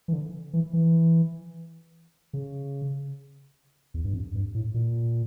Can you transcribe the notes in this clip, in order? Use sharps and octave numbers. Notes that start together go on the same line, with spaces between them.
E3
D3
E3
E3
C#3
E2
G2
F2
G2
A2
A#2